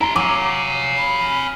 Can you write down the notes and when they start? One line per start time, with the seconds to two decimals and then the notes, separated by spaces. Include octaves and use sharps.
0.01 E4 A#5 C6
0.16 F#3 F5 G#5 D6
0.97 B5